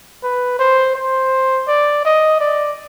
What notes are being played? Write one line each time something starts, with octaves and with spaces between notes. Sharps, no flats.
B4
C5
C5
D5
D#5
D5